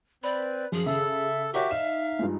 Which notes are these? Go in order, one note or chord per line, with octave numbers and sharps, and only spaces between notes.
C4 B4 D5
F#2 F3 G#4
C#3 A4 E5
F#4 G4 A#4 C#5 E5
D#4 F5 E7
G2 F3 G#3